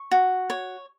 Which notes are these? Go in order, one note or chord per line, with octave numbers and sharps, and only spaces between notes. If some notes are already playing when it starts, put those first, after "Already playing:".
Already playing: C#6
F#4
C#5